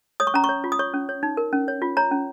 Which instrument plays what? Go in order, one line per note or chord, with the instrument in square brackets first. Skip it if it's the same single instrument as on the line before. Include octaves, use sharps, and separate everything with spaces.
[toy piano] C#5 D#6
C#6
C#4 A#5
C#6
C#5
F4
D#6
C#5 C#6
C#4
C#5
D#4
A#4
C#4
C#5
F4
C#5 A#5
C#4